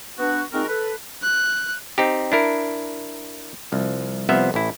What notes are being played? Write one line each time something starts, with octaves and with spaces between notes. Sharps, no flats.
B3 D4 F#4
A#2 G#3 C4 D#4 F#4 A#4
A4 B4
F#6
C4 D#4 G4
D4 E4 A#4
C2 F3
C2 C3 F3 B3 C5 E5
A1 E4